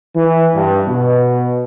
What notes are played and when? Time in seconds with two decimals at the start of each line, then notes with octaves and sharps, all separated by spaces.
0.16 E3
0.55 G2
0.88 B2